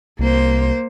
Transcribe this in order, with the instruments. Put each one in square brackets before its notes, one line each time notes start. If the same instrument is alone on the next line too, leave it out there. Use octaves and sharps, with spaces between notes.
[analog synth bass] C2 [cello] A#3 C5